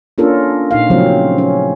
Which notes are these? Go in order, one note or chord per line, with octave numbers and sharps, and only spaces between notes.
A#3 C#4 D4 F4 A4 A#4
A#2 D#4 F5
C#3 F3 F#3 A3 C4 C#4
C#4